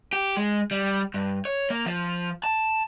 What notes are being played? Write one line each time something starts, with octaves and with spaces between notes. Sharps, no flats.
G4
G#3
G3
G2
C#5
A#3
F3
A5